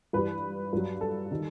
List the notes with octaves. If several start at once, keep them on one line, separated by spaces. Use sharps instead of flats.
G2 E3 G3 B4
G2 F#3
A4
D#3 G3